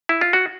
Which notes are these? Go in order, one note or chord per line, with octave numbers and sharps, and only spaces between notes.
E4
F4
F#4